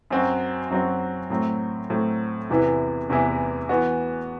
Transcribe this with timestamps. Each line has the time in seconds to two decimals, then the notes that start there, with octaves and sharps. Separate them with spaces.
0.10 F#2 F#3 C4 F#4
0.70 F#2 F#3 C4 F#4
1.30 A2 F#3 C4
1.90 A2 F#3 C4
2.50 E2 C3 E3 B3 E4
3.10 E2 C3 E3 B3 E4
3.69 E3 B3 F#4